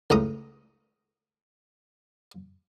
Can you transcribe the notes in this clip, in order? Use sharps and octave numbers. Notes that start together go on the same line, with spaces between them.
C#2 A2 A#5 D#6